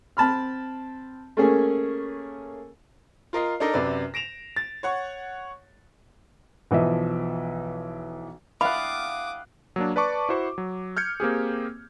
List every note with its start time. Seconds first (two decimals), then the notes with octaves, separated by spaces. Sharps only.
0.17 C4 A5 B5 F6
1.37 A3 A#3 C#4 G#4
3.33 F4 A#4 D#5 C7
3.60 D4 D#4 A4 A#4 D#5
3.73 F#2 C3 B4 D5
4.14 A#6 D7 E7 F7
4.56 A6
4.83 C#5 F#5 C#6
6.71 B1 E3 F3 D#5 E5
8.61 E4 G4 F5 F#5 A5 B5 D6 D#6
9.76 F#3 A#3 D4
9.96 B4 D5 A5 C#6 D6
10.29 E4 F#4 C5 C#6
10.58 F#3
10.97 F6 G6 G#6 C#7
11.20 A#3 C4 G4 G#4